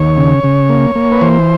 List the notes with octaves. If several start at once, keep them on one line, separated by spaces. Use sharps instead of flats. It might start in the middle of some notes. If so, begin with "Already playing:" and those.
Already playing: D#2 C#5
C#3
C#3
A#3
A#3
B4
E3 C5